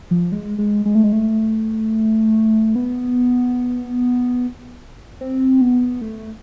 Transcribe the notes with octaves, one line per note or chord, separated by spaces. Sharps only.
F3
G#3
G#3
G#3
A3
G#3
A3
B3
C4
B3
A3